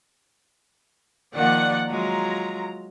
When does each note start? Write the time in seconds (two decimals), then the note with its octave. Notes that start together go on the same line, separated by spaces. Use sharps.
1.35 D#3 F3 A#3 D5 F#5
1.90 F#3 G#3 F4 A#5